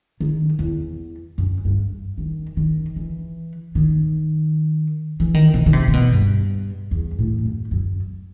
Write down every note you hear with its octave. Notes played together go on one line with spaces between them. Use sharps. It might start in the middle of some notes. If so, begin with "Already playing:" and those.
D#3
E2
F#2
G2
D#3
D#3
E3
D#3
E3
D#3
C3
D#3
C3
C3
B2
G2
E2
A2
F#2
F#2